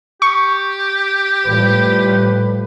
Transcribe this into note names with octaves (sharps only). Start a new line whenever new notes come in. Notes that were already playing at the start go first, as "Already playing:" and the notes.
G4 C#6
A2 F3 G3 B4